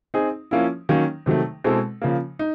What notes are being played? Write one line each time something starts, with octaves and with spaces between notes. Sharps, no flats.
C4 D#4 G#4
F3 A#3 C#4 E4
D#3 F#3 A#3 C#4
C3 D#3 F#3 A3
B2 G#3 C4 E4 A4
C#3 F3 A#3
D#4